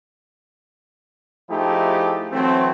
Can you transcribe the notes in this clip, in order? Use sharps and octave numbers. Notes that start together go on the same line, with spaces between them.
F3 A3 D#4 E4 G4 G#4
E3 F#3 A3 C4